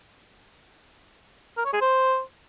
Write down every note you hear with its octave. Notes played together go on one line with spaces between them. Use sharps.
A#4
C#5
G#4
C5